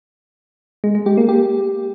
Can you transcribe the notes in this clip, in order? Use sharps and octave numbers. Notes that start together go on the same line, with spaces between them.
G#3
G#3
G4
A#3
G4